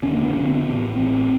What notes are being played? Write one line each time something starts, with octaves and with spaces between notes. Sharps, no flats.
F1 D#2 D3 C#4
A#3
B3
F1 D#2 D3 C#4
C4
B3
A1 A2
A1 A2 C4